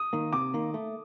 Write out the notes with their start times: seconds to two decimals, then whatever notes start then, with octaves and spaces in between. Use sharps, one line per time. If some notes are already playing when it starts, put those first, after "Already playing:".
Already playing: D#6
0.13 D#3 A#3
0.33 C3 D6
0.54 D#3 A#3
0.74 A3